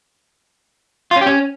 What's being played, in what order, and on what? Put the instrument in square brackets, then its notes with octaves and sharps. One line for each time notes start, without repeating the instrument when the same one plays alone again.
[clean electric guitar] F4
C#4
G4
C#4